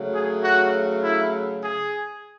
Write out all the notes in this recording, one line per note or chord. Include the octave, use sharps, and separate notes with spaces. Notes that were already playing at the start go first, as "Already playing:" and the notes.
Already playing: C#3 F#3 A3
G#4
F#4
E4
G#4